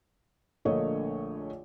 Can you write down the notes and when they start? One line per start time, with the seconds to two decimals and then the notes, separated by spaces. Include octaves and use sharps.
0.65 A#1 D3 A3 A#3 C#5 D#5